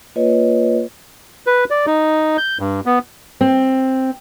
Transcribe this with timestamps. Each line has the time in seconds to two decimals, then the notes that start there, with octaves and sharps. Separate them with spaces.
0.16 A#3 F4 B4 C#5 D#5
1.47 B4
1.70 D5
1.86 D#4
2.38 G6
2.60 G2
2.86 B3
3.41 C4